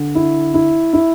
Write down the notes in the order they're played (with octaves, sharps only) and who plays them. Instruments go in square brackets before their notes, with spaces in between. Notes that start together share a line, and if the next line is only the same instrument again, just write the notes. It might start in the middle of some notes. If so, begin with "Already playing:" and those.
Already playing: [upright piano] D3
E4
E4
E4